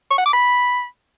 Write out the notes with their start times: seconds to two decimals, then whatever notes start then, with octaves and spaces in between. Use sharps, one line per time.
0.11 C#6
0.18 F#5
0.26 D6
0.33 B5